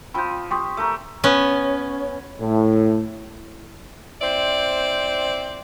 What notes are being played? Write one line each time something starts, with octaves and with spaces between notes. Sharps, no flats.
F3 C4 B5 G6
G4 C6 C#6 D#6
A3 A#4
B3 C#4
A2
C4 E4 C5 D5